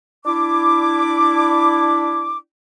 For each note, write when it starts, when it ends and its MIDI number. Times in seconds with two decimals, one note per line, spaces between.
0.25 2.37 62
0.25 2.37 64
0.25 2.37 86